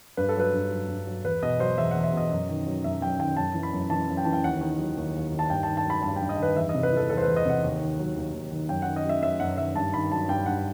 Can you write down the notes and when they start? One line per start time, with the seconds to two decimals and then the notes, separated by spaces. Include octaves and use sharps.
0.17 G2 B4
0.29 A4
0.36 F#3 B4
0.53 G2
0.71 F#3
0.88 G2
1.07 F#3
1.24 E2 B4
1.43 B2 D#5
1.59 F#3 C5
1.77 E2 E5
1.91 E2 F#5
2.04 E5
2.13 B2 D#5
2.31 F#2
2.49 D#3
2.67 F#3
2.84 F#2 E5
3.01 F#2 G5
3.19 D#3 G5
3.37 F#2 A5
3.54 E3
3.63 B5
3.73 F#2
3.90 E3 A5
4.08 F#2
4.17 G5
4.24 E3 A5
4.33 G5
4.44 D#2 F#5
4.61 D#3
4.79 F#3
4.97 D#2
5.15 D#2
5.32 D#3
5.39 A5
5.50 G2 G5
5.63 D#3 A5
5.77 A5
5.85 F#3
5.90 B5
6.03 G2 A5
6.16 G5
6.22 G2
6.29 D#5
6.39 D#3 B4
6.56 E2 E5
6.69 D#5
6.74 C3
6.83 B4
6.92 E3 A4
7.09 E2 A4
7.17 C5
7.22 E2 B4
7.36 D#5
7.45 C3 F#5
7.63 D#2
7.80 D#3
7.99 F#3
8.16 D#2
8.33 D#2
8.52 D#3
8.69 F#2 G5
8.82 D#3 F#5
8.96 D#5
9.05 F#3 E5
9.23 F#2 E5
9.40 F#2 F#5
9.57 D#3 E5
9.76 G2 A5
9.94 D#3 B5
10.11 F#3 A5
10.29 G2 G5
10.46 G2 F#5